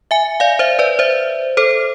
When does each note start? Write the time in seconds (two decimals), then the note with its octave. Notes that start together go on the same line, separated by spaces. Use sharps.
0.11 E5 G#5
0.40 D5 F5
0.59 C5 E5
0.79 B4 D5
0.99 C5 E5
1.57 A4 C5